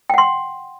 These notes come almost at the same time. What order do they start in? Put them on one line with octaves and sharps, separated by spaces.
G5 F#5 C6